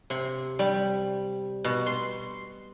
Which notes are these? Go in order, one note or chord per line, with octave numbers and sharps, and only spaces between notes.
C3
G3
B2
C6